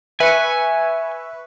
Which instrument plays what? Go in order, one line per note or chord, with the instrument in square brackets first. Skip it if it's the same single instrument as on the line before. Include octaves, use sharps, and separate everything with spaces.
[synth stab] B4 C#6 [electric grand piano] E5 [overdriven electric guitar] G#5